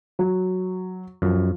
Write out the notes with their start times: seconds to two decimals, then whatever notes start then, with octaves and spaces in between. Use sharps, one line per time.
0.19 F#3
1.22 F#2 F3